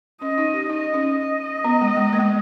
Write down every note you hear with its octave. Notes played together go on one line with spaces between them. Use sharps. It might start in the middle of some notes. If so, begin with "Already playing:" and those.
C#4 D#5
D#4
G4
D#4 D#5
C#4
D#5
B3
G#3
G#3
A#3
G#3